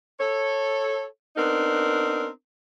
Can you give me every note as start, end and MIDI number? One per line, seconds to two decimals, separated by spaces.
0.19 1.04 69
0.19 1.04 73
1.36 2.27 59
1.36 2.27 60
1.36 2.27 62
1.36 2.27 63
1.36 2.27 70